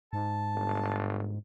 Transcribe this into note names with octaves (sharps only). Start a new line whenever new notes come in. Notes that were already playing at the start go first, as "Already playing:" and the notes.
G#2 A5
G1